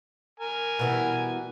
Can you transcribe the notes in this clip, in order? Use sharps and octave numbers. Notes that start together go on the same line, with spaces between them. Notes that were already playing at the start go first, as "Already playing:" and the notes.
A#4 G#5
B2 E3 G3